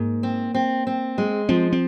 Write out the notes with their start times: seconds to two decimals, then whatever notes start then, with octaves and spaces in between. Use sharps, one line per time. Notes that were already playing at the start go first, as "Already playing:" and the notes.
Already playing: G#2 A#3
0.23 C4
0.55 C4
0.87 C4
1.18 G#3
1.49 F3 C4
1.72 C4